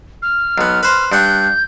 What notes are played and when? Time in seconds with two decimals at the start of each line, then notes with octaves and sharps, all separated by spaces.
0.22 F6
0.58 B1 B3
0.83 B4 C5
1.12 G2 F#5 G6